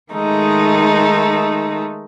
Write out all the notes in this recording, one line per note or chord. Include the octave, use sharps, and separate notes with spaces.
D#3 G#3 A3 D#4